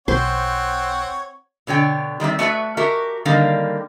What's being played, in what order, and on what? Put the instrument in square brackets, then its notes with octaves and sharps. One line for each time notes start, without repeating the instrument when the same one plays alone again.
[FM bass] B1 [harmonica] C4 C#5 F#5 [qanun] C5
[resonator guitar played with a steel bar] B2 D3 C#5 G5
D#3 G3 C4 E5
A3 F#4 B4 E5
F#4 G4 A#4 E5
D3 D#3 G3 A#3 F5